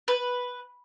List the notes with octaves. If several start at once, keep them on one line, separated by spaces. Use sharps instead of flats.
B4